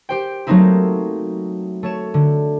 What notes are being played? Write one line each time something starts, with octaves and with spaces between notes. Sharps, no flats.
G4 C5 G5
F#3 A3 A#3 C4 D#4 E4
A3 C#5 E7
D3